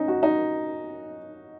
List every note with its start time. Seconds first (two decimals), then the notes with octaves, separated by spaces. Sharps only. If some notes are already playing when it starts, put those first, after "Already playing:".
Already playing: C#4 D#4
0.08 F#4
0.23 D#4